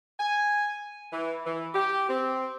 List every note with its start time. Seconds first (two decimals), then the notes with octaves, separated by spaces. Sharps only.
0.20 G#5
1.12 E3
1.46 E3
1.75 G4
2.09 C4